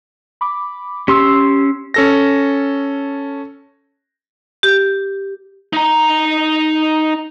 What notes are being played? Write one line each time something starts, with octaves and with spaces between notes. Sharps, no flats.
B5 D6
C#4 G4 C6 E6
C#4 A4 A#6
G4
D#4 A#5